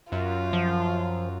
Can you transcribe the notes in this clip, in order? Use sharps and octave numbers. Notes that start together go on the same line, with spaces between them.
F#2 F4
F3